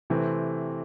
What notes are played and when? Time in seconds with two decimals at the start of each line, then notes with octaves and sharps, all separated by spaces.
0.10 C3 E3 A3 C4